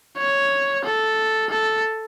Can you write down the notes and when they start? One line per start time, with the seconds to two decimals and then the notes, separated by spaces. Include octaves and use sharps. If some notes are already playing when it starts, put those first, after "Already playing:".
0.18 C#5
0.84 A4
1.50 A4